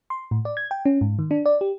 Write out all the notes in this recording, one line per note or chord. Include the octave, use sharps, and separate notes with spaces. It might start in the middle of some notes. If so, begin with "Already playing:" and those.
C6
A2
D5
G#6
G5
C#4
G#2
D#3
D4
D5
G4